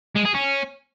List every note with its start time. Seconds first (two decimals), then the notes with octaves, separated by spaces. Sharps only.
0.15 G#3
0.25 G#4
0.34 C#4